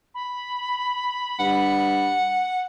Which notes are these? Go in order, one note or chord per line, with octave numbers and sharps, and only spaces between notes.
B5
G2 F#5